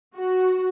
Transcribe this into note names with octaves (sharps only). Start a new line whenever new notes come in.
F#4